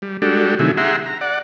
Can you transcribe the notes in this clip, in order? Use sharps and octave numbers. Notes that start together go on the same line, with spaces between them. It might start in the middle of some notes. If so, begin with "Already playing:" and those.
G3
G3 G#3 D4 F#4 G4 A4
C3 D#3 F#3 A3 E4 G#4
G4 G#4 E5 F#5 A#5 C6
A#5
D5 F#5